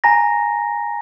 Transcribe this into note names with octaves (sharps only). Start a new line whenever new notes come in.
G#5 A#5 A#6